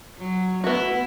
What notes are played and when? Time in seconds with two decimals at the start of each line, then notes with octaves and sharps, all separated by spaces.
0.18 F#3
0.64 A3 B3 E4 F#4